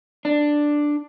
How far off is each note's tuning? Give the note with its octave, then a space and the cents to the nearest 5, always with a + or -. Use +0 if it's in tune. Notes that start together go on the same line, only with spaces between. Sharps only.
D4 +5